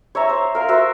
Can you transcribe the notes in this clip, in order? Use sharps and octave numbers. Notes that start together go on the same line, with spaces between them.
C#5 E5 A#5
C5
A#4 F5
F#4 A#4 C5 E5